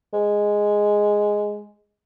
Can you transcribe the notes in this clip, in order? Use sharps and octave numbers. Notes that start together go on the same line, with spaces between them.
G#3